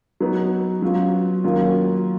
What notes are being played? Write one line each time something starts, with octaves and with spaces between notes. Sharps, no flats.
F#3 B3 D#4
F#3 C#4 F4
D#3 F#3 A#3 C#4 F4